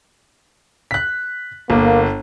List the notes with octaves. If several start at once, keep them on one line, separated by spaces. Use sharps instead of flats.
F#6 B6
G1 A#3